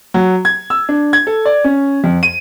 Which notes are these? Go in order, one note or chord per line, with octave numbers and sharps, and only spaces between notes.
F#3
G#6
E6
D4
G#6
A4
D5
C#4
F2
D#7